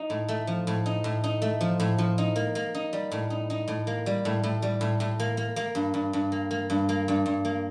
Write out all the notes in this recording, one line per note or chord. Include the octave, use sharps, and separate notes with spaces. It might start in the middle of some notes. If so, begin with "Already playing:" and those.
Already playing: D#4
A2
A3
F3
A2
D#4
A2
D#4
A3
F3
A2
F3
D#4
A#3
A#3
D#4
G3
A2
D#4
D#4
A2
A#3
G3
A2
A2
G3
A2
A2
A#3
A#3
A#3
G2
G2
G2
A#3
A#3
G2
A#3
G2
G2
A#3